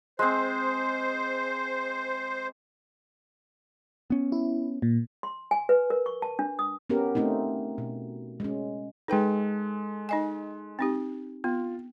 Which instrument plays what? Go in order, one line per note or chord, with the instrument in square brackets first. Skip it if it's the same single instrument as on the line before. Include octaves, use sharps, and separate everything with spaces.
[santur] G#3 C4 [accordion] C5
[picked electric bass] B3 C#4
[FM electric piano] E4
A#2
[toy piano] C6
G#5
B4
A#4
C#6
A5
D4
D#6
[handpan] B3 C#4 G4 A#4
A3 C4 C#4 D#4
B2
G#3 C#4
[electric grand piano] G#3 A4 [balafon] D#4 B4 G5
[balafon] D#4 D#5 G#5
C4 D#4 G4
[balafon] B3 [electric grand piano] F4